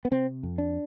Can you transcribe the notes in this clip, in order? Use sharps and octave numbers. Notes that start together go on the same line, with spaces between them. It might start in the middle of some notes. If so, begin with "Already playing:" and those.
B3
C3 C4
F2
D4